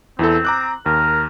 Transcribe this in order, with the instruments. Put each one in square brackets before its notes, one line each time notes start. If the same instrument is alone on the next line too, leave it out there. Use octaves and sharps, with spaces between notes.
[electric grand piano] E2 E4 A4 [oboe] C4
[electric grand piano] A#5 D6 F#6
[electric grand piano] D#2 [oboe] A#4